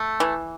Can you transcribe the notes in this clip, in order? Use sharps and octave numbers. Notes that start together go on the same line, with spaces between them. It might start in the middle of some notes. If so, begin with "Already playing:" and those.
Already playing: A3
E3